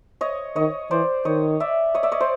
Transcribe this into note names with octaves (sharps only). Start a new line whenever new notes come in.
C#5 D#5
D#3 C#5 D#5
E3 C5 D5
D#3 C#5 D#5
D5 E5
C#5 D#5
D5 E5
C#5 D#5
C5 D5